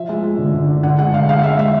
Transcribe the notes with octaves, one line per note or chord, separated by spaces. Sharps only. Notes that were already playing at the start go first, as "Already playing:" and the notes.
Already playing: F3 E5
G#3
G#3
D3
D3
D3
D3 F#5
G#3 F#5
D3 F5
G#3 F5
G#3 E5
G#3 E5